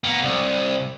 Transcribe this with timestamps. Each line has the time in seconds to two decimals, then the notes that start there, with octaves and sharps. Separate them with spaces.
0.04 A#3 B3
0.22 C2